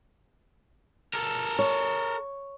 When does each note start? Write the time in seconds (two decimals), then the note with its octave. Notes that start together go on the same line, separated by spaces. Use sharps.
1.14 A4 A#4
1.59 C#5